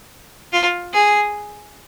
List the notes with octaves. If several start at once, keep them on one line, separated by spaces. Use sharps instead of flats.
F4
G#4